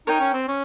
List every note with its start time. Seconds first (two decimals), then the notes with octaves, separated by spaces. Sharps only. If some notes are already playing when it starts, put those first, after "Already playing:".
0.07 D#4 A#4 C#5 G5
0.20 C#4
0.34 C4
0.48 C#4